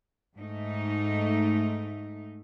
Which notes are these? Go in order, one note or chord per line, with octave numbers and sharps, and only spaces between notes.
G#2 A3 D#4